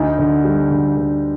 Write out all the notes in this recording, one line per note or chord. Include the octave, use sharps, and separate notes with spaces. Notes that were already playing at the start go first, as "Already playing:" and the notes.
Already playing: D2 D#4
D3
G3
D2
D2